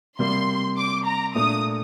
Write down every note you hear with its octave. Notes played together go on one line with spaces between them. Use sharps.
C3 G3 A#3 C6
D6
A#5
A#2 A3 D4 D#6